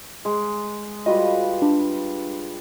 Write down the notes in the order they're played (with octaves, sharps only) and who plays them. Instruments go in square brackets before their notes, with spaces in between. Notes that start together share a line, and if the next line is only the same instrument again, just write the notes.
[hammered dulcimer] G#3
[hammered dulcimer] G3 F4 B4 [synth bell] F#4 D#5
[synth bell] D4